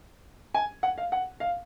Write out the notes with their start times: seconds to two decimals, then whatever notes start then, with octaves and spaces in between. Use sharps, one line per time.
0.54 G#5
0.83 F#5
0.98 F5
1.12 F#5
1.40 F5